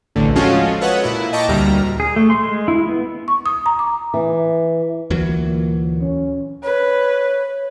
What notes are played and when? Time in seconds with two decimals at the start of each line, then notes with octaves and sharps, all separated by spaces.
0.15 A1 D2 A2 D3
0.35 F3 G#3 C#4 F4 F#4 A4
0.81 A4 B4 C#5 D#5 F#5
1.04 A#2 E4
1.33 D#5 G5 A5 A#5 C#6 D6
1.49 D2 A#2 G3 E5 A#5 F6
2.00 G#4
2.16 A3
2.30 C6
2.43 G#3
2.68 E4
2.89 B3
3.28 C#6
3.46 D#6
3.66 A#5
3.79 D6
4.14 E3
5.10 D2 A#2 E3 F#3
6.02 C#4
6.63 B4 C#5